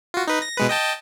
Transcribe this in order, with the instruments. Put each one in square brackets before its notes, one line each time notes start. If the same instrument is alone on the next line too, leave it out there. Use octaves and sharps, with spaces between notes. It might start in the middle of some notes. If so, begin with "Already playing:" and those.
[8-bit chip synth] F4 F#4
D#4 B4
A#6
B2 G#3 B4
D#5 G5 A5